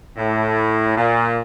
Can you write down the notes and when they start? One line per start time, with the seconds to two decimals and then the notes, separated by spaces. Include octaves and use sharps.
0.17 A2
0.96 A#2